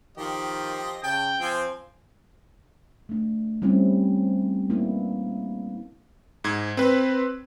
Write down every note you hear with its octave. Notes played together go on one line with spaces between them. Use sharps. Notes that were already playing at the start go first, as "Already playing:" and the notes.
D#3 F3 G4 D#5
C#3 G5 A5
F3 C4 G#5
A3 D4
G3 C4 C#4 E4
A#3 B3 D4 E4
G#2 G#6
C4 B4